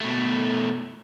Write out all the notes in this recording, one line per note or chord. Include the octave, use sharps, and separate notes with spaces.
B2 A3